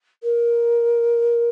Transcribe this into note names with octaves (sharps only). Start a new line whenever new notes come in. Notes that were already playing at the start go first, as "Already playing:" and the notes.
A#4